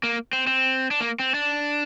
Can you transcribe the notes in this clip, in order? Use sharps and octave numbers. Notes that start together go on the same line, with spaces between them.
A#3
C4
C4
D4
A#3
C4
D4